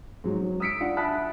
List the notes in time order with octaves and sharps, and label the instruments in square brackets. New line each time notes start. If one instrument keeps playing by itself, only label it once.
[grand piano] G#2 F#3
F#3
D#6 E6 B6 C#7 D7
D4 F4 F#5
E5 A5 B5 D#6 F#6 B6